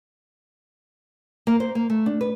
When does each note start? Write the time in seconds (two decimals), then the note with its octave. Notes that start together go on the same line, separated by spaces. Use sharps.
1.47 A#3
1.60 C5
1.75 A#3
1.90 A3
2.06 D4
2.21 B4